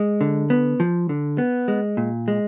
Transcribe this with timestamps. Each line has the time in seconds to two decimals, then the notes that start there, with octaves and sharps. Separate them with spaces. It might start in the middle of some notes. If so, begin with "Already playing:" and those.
Already playing: G#3
0.21 D3
0.50 B3
0.80 F3
1.09 D3
1.38 B3
1.68 G#3
1.97 A#2
2.28 G#3